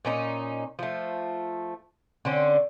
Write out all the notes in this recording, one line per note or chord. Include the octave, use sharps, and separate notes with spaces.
A#2 C#4 D#4
F3 A3
D3 C4 C#4